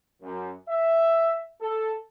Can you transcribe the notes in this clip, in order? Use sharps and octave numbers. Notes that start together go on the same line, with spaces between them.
F#2
E5
A4